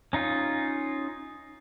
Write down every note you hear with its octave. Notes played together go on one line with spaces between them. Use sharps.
C#4 D#4 F4